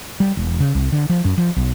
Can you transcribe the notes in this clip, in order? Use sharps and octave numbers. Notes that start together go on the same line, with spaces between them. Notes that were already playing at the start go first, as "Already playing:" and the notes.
G3
E1
C#3
C2
D3
F3
F#2
F3
B1